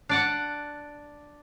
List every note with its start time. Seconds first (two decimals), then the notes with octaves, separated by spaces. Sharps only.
0.09 D4 D5 F#5